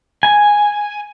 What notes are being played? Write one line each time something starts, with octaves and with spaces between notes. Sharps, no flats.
G#5